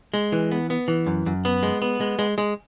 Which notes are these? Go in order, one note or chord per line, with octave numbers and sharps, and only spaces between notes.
G#3
E3
B3
B3
E3
F#2
F#2
B3
G#3
B3
G#3
G#3
G#3